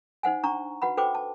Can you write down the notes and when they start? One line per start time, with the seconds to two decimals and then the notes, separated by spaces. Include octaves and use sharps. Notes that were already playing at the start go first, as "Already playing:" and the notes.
0.23 D#4 C5 F#5 G#5
0.43 D4 A#5 C#6
0.82 F#4 B4 F#5 B5
0.97 F#4 A4 B4 C5 G5 D6
1.15 A5